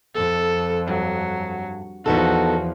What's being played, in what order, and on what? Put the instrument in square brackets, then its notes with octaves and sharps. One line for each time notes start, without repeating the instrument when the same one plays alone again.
[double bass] F2 [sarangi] A4
[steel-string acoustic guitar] G2 [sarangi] F#3
[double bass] E2 F3 [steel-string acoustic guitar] B3 D#4 A4 [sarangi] F#4